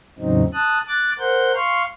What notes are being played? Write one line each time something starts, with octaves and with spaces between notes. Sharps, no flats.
E2 A2 C#3 F#3 C4 D#4
A5 D#6 F#6
D6 F#6 A6
A#4 C5 F#5 G6
F5 C6 C#6 F6